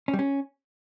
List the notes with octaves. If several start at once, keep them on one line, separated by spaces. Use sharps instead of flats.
C#4
G3
C#4